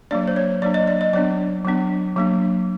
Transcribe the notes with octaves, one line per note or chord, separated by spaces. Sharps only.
F#3 A#3 D4 D5
C5
C#5
F#3 A#3 D4 D5
D#5
D5
D#5
F#3 B3 D4 D5
F#3 B3 D4
F#3 A#3 D4